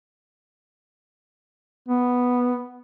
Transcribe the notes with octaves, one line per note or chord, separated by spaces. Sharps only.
B3